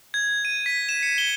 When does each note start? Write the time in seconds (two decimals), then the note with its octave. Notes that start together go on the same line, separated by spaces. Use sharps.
0.14 G#6
0.45 D#7
0.66 B6
0.89 E7
1.03 C#7
1.18 G7